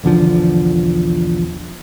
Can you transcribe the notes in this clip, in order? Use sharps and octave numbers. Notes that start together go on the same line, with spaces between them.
B1 E2 D3 F3